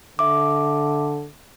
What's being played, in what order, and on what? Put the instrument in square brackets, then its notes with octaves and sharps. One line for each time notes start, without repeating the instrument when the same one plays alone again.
[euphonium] D3 [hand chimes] E5 D6